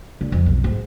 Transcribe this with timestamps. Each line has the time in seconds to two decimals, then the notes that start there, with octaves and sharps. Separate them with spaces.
0.21 D3
0.32 F2
0.46 B1
0.64 G#2